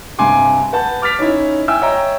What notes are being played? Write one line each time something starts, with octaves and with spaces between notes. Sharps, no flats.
G2 C3 G#5 C6 D6
B4 F#5 A5 G6
D6 F6 A6 B6 F7
C#4 D#4 E4
E5 G5 G#5 E6
C#5 D#5 E5 G5 A#5